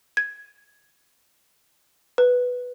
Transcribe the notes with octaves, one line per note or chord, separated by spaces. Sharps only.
G#6
B4